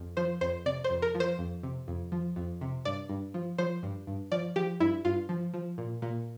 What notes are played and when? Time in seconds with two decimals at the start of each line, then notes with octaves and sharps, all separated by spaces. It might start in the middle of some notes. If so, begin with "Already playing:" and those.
Already playing: F2
0.17 F3 C5
0.41 F2 C5
0.66 C3 D5
0.84 C5
0.90 F2
1.02 A#4
1.15 F3
1.20 C5
1.39 F2
1.63 C3
1.88 F2
2.12 F3
2.36 F2
2.61 C3
2.85 G2 D5
3.09 G2
3.34 F3
3.58 F3 C5
3.83 G2
4.07 G2
4.32 F3 D5
4.56 F3 G4
4.80 G2 E4
5.05 G2 F4
5.29 F3
5.53 F3
5.78 A#2
6.02 A#2